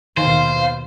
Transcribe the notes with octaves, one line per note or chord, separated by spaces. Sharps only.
D#2 B2 D#3 C5 F5